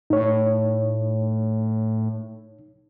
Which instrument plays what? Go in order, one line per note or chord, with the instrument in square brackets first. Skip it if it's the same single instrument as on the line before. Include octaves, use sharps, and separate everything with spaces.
[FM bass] A2 [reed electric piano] D#4 C#5